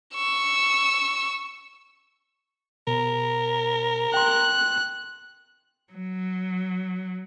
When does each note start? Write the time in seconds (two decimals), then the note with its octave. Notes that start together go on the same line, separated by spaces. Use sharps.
0.14 C#6 E6
2.87 B2 A#4
4.14 G5 C6 F#6
5.93 F#3